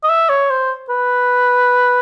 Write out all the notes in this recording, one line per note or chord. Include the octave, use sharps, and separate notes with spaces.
D#5
E5
C#5
C5
B4